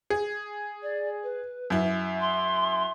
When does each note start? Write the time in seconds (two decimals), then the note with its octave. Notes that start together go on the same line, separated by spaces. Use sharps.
0.10 G#4
0.82 D5
1.23 B4
1.70 F#2 E4
2.20 C6